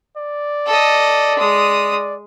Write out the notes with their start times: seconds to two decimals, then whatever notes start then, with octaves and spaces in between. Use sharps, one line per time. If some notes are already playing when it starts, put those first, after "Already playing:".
0.17 D5
0.67 A4 D#5
1.38 G#3 D#6